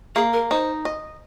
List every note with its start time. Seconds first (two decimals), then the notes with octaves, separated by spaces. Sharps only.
0.15 A#3 G#4
0.33 A#4
0.51 D#4 C5
0.85 D#5